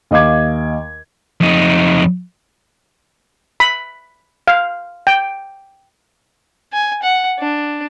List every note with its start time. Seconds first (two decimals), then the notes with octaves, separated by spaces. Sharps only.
0.11 D#2 D#5 F5 D6 G#6
1.41 F2 D#4
3.60 B5
4.48 F5
5.07 G5
6.73 G#5
7.02 F#5
7.39 D4